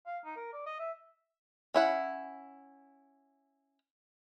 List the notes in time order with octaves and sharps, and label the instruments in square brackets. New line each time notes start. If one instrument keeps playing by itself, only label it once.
[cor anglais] F5
D#4
A#4
D5
D#5
E5
[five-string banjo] C#4 E4 F#5